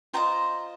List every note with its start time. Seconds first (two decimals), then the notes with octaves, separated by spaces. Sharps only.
0.13 F4 C5 D#5 G5 A#5